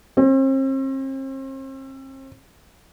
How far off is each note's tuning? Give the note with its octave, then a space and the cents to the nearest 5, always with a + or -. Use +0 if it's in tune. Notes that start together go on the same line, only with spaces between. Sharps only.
C4 +40